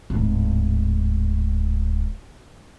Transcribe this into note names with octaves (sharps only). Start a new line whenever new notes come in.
D1 G#2